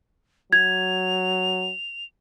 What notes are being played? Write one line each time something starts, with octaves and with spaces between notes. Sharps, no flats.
F#3 G#6 F7